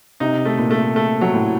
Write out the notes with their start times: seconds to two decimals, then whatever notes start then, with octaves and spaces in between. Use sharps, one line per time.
0.20 C3 D#4
0.45 A3
0.58 A#2
0.71 A3
0.96 A3
1.21 F#3
1.34 A2